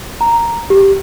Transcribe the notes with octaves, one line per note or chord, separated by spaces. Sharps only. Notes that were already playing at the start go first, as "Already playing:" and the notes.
A#5
G4